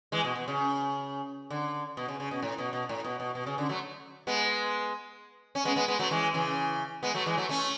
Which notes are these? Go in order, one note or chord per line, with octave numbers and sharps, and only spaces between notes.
E3 G#3
B2
B2
C#3
D3
B2
C#3
C#3
B2
A2
B2
B2
A2
B2
B2
B2
C#3
D3
F#3 A3
G#3 B3
C#4
G#3 B3
G#3 B3
G#3 B3
F#3 A3
E3 G#3
C#3 E3
G#3 B3
F#3 A3
E3 G#3
F#3 A3
A3 C#4